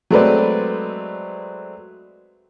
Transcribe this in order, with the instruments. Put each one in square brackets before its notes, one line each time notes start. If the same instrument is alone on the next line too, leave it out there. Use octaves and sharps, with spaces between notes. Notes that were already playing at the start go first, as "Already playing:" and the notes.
[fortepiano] F#3 G#3 A3 C4 B4 D5